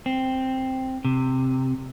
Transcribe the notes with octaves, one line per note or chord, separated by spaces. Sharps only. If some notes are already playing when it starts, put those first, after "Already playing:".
C4
C3